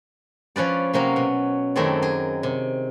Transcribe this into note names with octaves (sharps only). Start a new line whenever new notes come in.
F3 C#4 B4 D5
C3 F#3 A#3 C4 C#4
B2
F#2 D#3 A3 C4 G#4 D5
G#4
C3